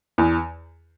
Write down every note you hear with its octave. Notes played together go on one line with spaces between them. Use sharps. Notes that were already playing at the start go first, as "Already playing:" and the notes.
E2 E3